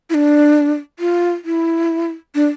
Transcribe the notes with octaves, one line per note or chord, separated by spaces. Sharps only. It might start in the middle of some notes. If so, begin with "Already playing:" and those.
E4
D4
F4
E4
D4